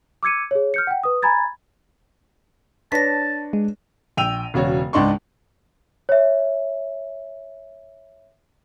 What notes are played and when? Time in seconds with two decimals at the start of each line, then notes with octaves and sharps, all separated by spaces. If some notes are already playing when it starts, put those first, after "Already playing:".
0.23 D6 E6 G#6 C#7 D#7
0.51 G#4 C#5
0.74 F6 G6 C#7
0.87 F#5 G5
1.04 B4 D#6
1.22 G#5 A#5 B5 G#6 A6
2.92 D4 B4 C#5 A5 A#6 B6
3.53 G#3
4.17 A#1 G5 E6 D#7 F7
4.54 E1 C#3 F#4 C#5
4.93 C#2 G#2 D4 D#4 C6 C#6
6.09 C#5 E5